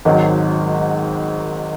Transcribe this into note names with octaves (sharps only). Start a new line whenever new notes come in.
G#1 G#2 D#3 F#3